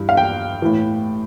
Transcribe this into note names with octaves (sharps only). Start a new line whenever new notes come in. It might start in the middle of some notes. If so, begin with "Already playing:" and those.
Already playing: G2 E3
F5
G5
A2 E3